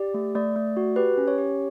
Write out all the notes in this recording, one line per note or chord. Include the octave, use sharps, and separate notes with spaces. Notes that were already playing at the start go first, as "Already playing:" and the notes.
Already playing: G4 D5
A3
A3 D5
A3
F#4
G4 B4
C#4
C#5
G4